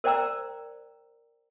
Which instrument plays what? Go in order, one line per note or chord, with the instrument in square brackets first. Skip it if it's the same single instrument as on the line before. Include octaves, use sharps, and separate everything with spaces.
[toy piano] A#4 C5 D5 G5 A#5 E6